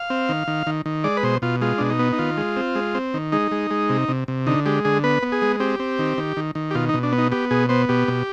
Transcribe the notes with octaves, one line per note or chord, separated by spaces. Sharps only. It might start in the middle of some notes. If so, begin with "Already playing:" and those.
Already playing: F5
C4
D#3
D#3
D#3
D#3
G#3 D5
B4
B2 C5
B2 F4
G#3 F4
B2 D4
D#4
B3
D#4
D#3 F4
G#3
C4
G#3
C4
D#3
G#3 D#4
G#3
G#3
C3
C3
C3
D3 D#4
G#3 G4
D3 G#4
B3 B4
B3
G#4
G#3
C4 G4
C4
D#3
D#3
D#3
D#3
G4
B2 F4
B2 D#4
D4
B3
D#4
B3 G4
B2 G#4
B3 C5
B2 G4
B2